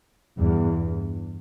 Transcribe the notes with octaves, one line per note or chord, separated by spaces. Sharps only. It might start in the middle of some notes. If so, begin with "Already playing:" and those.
E2 G2